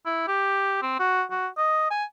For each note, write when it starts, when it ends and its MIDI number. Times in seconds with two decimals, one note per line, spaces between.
0.06 0.27 64
0.28 0.78 67
0.82 0.96 60
0.99 1.23 66
1.31 1.47 66
1.58 1.89 75
1.91 2.05 80